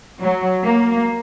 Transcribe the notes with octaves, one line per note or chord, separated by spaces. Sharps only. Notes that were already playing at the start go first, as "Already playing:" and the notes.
F#3
A#3